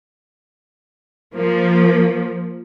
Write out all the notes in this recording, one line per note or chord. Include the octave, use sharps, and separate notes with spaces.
F3 A#3